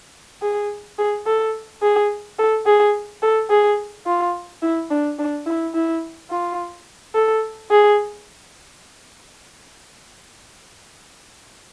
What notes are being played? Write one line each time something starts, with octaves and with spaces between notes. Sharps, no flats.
G#4
G#4
A4
G#4
A4
G#4
A4
G#4
F4
E4
D4
D4
E4
E4
F4
A4
G#4